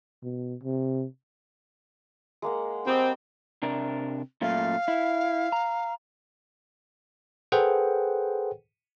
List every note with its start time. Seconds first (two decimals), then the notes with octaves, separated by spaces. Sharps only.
0.23 B2
0.63 C3
2.42 G#3 A#3 F#5
2.86 G3 C4 D#5
3.62 C3 D4 A#4
4.41 F#2 A#2 A3 F5
4.88 E4
5.52 A#5
7.52 G#4 A4 B4 C5 F#5 G5